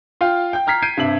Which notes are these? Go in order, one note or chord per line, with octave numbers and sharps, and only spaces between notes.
F4 F5 G5
G5 G6
A#5 F6 G#6 B6 C7
G6 G#6 C7 D7 D#7
G2 C3 E5 F#7